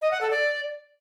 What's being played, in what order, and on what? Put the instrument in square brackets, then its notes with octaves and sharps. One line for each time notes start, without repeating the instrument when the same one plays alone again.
[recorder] D#5
F#5
A4
D5